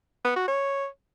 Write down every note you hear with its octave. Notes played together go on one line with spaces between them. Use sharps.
B3
F#4
C#5